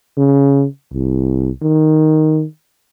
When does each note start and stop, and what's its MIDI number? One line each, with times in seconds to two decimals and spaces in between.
0.17 0.65 49
0.93 1.50 36
1.62 2.44 51